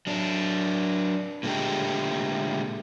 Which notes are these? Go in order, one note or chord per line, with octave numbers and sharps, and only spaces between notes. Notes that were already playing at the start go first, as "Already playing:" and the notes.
F#3 D4
A#2 D3 G#3 A3 G4